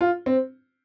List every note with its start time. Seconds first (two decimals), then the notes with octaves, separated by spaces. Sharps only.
0.01 F4
0.26 C4